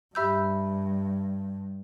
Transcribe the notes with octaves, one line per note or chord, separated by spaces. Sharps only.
G2 G4 E5 B5 E6 G6